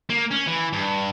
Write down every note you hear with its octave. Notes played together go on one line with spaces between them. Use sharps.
A#3
C#4
E3
G2